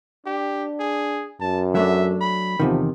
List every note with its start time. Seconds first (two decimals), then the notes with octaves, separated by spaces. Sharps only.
0.26 D4 G4
0.79 G#4
1.41 F#2 A5
1.75 F#3 A3 D4 E5
2.21 B5
2.60 E2 C3 D#3 F3